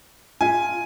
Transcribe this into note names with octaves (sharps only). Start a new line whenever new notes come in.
F4 E5 G#5